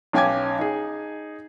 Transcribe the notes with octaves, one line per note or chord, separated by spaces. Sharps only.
B1 C#4 G5 G#5 D6 G#6
D#4 G#4